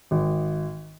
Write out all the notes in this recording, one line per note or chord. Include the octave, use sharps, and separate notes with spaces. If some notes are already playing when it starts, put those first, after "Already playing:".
G#1